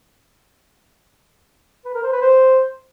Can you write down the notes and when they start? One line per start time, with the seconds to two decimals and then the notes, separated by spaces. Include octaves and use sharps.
1.85 B4
1.94 A#4
2.03 C5
2.12 B4
2.22 C5